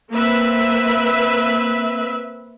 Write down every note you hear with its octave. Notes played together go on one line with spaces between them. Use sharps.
A#3 C4 B4 E5